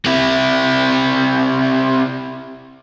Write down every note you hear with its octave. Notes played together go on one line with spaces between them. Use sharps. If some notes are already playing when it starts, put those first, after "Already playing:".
C3 E4